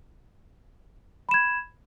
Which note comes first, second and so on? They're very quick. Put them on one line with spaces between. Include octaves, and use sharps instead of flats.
B5 E7 G#6